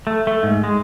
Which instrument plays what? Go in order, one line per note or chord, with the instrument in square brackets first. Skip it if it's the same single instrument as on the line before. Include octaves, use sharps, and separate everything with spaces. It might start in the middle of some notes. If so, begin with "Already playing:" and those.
[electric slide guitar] A3
A3
G#2
G#3